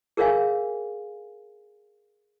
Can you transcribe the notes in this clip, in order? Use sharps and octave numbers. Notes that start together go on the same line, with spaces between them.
G#4 A#4 C#5 E5 F5 G#5